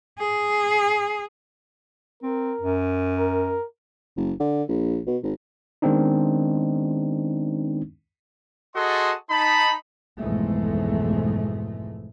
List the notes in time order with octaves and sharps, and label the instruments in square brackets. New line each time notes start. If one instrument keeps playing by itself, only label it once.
[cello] G#4
[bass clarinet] C4 [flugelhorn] A#4
[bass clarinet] F#2
[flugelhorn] A#4
[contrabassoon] F#1
D3
A#1
B2
G#1
[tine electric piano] D#3 G#3 B3 C4 D4 D#4
[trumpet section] F#4 G#4 A4 D#5 A5 C6
D#4 A5 B5
[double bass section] B1 F2 G#2 E3 G#3 A3